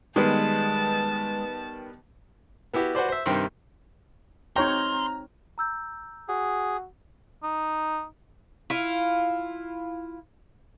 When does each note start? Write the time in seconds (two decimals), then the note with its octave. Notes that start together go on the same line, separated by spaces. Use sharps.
0.16 D#3 G3 G#3 B3 A5
2.74 B3 E4 F#4 G4
2.95 F#4 B4 C5 D5
3.09 C5 E5
3.26 G2 C3 D#3 C4 G5
4.56 C4 D#4 C#5 G5 A#5 C6 F6
5.58 A#5 E6 G6
6.28 F#4 G#4
7.43 D#4
8.70 E4 F4